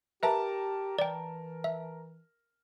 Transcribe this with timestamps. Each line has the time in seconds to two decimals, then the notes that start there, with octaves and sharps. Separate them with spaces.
0.23 G4 A#4 B4 E5 A5
0.99 E3 D5 G5
1.64 E5